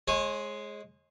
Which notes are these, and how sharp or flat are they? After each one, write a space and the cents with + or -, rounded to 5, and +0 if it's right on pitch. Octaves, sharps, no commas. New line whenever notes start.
G#3 +10 C#5 -35 D#6 +0